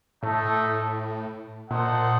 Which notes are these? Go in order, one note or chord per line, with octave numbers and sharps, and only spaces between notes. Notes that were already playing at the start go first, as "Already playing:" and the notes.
A2 A3 D#4 A4
A#2 D#4 A4 C5 D#5 F#5